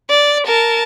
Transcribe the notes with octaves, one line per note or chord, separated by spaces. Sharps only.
D5
A#4 A5